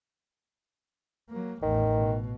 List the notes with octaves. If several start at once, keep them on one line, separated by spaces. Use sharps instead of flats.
F#3 A#3
A1 E2 D#3
B2